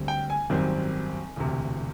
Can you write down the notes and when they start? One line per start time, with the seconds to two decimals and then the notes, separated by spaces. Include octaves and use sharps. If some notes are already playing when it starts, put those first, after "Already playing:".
Already playing: D2 D3 G3 C4
0.08 G5
0.30 G#5
0.50 G#1 F#2 D#3 G3 C4
1.36 E1 D2 C3